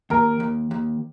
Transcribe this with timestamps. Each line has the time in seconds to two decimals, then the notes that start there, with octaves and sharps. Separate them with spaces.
0.10 D#2 A#4
0.40 D#2
0.71 D#2